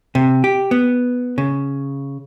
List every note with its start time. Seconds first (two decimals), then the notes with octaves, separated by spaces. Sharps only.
0.15 C3
0.44 G4
0.71 B3
1.38 C#3